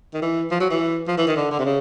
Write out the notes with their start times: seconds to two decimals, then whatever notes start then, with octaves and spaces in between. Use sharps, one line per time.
0.14 D#3
0.22 E3
0.51 F3
0.60 F#3
0.71 E3
1.08 F3
1.18 E3
1.27 D#3
1.37 D3
1.51 D3
1.59 C3
1.65 C#3